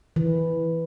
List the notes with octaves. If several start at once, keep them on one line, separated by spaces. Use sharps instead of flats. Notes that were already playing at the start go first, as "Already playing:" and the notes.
E3